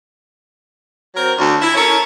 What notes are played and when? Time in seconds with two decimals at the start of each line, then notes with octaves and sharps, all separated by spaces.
1.16 F#3 C4 A#4
1.38 D2
1.61 E4
1.75 C#4 A4 A#4 C#5